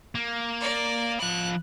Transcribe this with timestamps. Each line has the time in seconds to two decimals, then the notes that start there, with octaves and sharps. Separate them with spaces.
0.15 A#3
0.61 D5
1.20 F3 B5 F#6